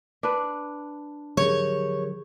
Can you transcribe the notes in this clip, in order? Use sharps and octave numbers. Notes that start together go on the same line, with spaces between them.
D4 B4
D3 F3 F#3 G4 G#4 A#4 C#5